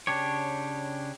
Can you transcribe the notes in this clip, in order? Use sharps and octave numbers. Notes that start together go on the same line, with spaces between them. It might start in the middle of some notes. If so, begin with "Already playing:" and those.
C#3 D4 G4 C#5